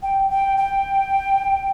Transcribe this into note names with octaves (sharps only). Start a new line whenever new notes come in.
G5
G5
G5